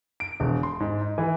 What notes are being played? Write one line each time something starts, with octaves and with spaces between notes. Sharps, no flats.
D7
E1
C6
G#2
D#4
E3